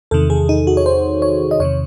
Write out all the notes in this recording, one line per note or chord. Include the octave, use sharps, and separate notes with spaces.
E2 C3 D#3 A4
G#4
D#4
F#4
C#5
C5
C#5
D#5
E2 C3 D#3 C#5